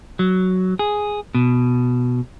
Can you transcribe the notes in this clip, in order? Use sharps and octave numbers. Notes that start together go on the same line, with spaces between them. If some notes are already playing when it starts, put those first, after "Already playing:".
F#3
G#4
B2